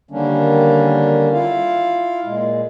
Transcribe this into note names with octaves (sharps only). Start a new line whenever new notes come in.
D3 D#3 G3 A#3 C#4 D4
E4 F4 F5
A#2 G#3